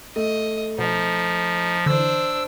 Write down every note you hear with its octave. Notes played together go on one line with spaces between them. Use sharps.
A3 D#5
B2 F3 D#4
D3 E3 D4 C5 E6